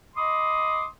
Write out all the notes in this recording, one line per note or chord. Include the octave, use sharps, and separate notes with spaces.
D#5 B5 C6 D6 D#6